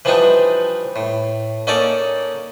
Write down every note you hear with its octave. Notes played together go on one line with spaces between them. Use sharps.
E3 F3 G3 D4 D#4
A2
A#3 C#4 D#4 A4 D5